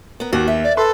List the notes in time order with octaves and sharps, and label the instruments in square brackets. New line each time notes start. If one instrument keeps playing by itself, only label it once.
[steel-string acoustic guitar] B3 A#4
[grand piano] D#2 [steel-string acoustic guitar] F#4
[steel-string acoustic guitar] E5
[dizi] D5
[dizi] A4 [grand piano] B4 C6